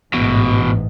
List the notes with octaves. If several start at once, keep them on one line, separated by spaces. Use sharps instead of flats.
A1 E2 G#2 B2